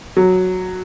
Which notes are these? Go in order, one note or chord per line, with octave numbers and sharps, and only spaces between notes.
F#3